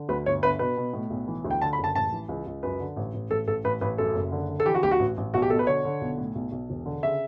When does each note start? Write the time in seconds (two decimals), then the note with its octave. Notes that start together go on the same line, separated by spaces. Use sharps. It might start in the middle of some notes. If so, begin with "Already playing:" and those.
Already playing: D3
0.09 D2 B4
0.26 G1 C#5
0.43 G1 B4
0.59 B2 B4
0.77 B2
0.93 A2
1.10 B1
1.27 E3
1.45 D2
1.51 G5
1.62 D3 A5
1.73 B5
1.79 F#1
1.84 A5
1.95 A1 A5
2.12 E3
2.29 C#2
2.46 C#2
2.63 F#2 B4
2.80 D3
2.96 A1
3.14 A1
3.30 A1 A4
3.47 A1 A4
3.64 A1 B4
3.81 A1 B4
3.98 F#2 A4
4.15 F#1
4.32 D3
4.49 D3
4.60 A4
4.66 E3 G4
4.74 F#4
4.83 D2 G4
4.91 F#4
4.99 A1
5.17 A1
5.34 B1 F#4
5.42 G4
5.50 B2 A4
5.59 B4
5.67 D3 C#5
5.85 D3
6.01 B1
6.18 A2
6.35 B1
6.52 B1
6.69 E1
6.86 D3
7.03 C#3 E5